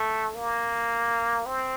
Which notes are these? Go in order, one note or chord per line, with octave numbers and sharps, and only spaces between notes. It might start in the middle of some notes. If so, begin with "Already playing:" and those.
Already playing: A3
A#3
C4